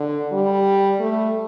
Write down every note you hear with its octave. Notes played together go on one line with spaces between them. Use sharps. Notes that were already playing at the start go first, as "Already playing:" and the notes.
Already playing: D3
G3
A3